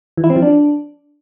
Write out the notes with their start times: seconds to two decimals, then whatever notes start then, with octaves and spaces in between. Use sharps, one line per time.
0.17 E3
0.24 E4
0.30 C4
0.36 F3
0.42 D4